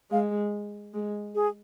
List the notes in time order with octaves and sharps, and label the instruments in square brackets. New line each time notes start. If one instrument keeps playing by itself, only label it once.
[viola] G#3 [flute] F5
[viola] G#3
[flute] G#4